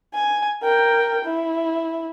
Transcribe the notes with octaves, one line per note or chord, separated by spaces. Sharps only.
G#5
A#4 G5
E4